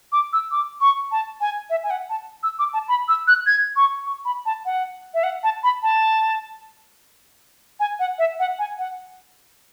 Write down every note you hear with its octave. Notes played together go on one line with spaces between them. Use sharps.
D6
E6
D6
C#6
A5
G#5
E5
G#5
F#5
A5
E6
D6
A5
B5
E6
F#6
G#6
C#6
C#6
B5
A5
F#5
E5
F#5
A5
B5
A5
G#5
F#5
E5
F#5
G#5
F#5